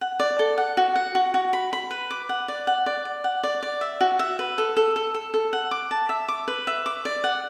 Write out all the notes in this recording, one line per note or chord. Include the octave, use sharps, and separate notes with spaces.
F#5
D5
A4
F#5
F#4
F#5
F#4
F#4
B5
B5
B4
D6
F#5
D5
F#5
D5
D5
F#5
D5
D5
E5
F#4
E5
B4
A4
A4
A4
A4
A4
F#5
D6
A5
E5
D6
B4
E5
D6
D5
F#5